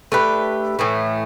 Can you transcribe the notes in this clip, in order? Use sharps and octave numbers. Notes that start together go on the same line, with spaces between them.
A3 D4 G4 B4
A2 E3 A3